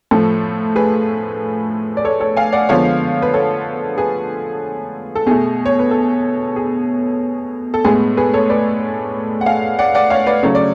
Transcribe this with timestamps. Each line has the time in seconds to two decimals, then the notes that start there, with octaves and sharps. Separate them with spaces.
0.11 A2 F3 A3 A4
0.76 G#4 B4
1.97 D5
2.04 A4 C#5
2.20 A4 C#5
2.37 F5 G#5
2.52 D5 F#5
2.69 D3 F3 G#3 B3 C#5 F5
3.22 B4
3.34 A4 C#5
3.98 G#4 B4
5.15 A4
5.27 B2 A3 G#4
5.66 C#5
5.79 B4
5.91 A4
6.56 G#4
7.74 A4
7.85 A2 G#3 B3 G#4
8.17 G#4 B4
8.34 A4 C#5
8.49 B4 D5
9.41 F#5
9.46 F5 G#5
9.79 D5 F#5
9.95 D5 F#5
10.10 C#5 F5
10.27 B4 D5
10.43 C#3 F#3 A3 C#5
10.55 D5